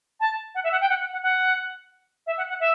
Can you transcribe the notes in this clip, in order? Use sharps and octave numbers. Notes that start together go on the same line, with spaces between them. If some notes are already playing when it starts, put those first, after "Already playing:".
A5
F#5
E5
F#5
G5
F#5
F#5
F#5
F#5
E5
F#5
F#5
E5